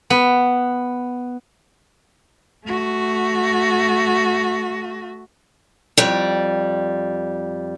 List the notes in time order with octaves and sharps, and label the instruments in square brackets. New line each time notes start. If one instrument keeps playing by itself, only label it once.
[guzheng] B3
[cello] A3 F#4
[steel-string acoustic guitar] F2 G3